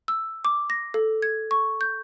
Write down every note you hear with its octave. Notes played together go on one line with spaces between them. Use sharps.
E6
D6
A#6
A4
G#6
C#6
G6